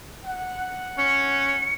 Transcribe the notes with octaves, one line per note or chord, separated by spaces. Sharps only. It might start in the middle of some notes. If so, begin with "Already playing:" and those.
F#5
C#4 C#7